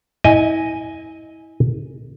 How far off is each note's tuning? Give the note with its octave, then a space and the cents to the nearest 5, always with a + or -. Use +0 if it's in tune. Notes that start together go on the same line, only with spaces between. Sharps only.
E4 -30 D#5 +0 G#5 +0